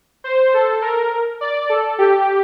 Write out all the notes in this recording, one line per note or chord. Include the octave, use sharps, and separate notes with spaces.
C5
A4
A#4
D5
A4
G4